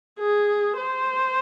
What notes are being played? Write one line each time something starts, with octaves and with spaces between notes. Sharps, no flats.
G#4
C5